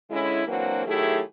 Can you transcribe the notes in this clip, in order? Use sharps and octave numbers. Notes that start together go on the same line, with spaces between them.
D3 G#3 C#4 E4
E3 F#3 A#3 C4 D4 F#4
D#3 F#3 A3 E4 G4 G#4